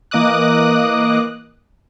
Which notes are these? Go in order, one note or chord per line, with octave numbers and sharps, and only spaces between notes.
E3 A#3 D#5 D6 D#6 F#6